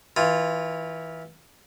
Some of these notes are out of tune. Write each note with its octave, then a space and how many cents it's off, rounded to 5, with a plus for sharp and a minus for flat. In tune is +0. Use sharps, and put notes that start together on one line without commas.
E3 -20 F4 +0